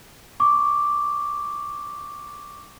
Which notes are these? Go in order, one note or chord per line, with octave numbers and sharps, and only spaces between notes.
C#6 D6